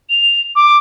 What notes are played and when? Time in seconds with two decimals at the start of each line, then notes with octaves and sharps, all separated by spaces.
0.09 F7
0.55 D6